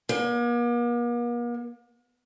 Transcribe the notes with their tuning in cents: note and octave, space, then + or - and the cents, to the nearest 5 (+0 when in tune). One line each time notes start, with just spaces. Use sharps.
A#3 +45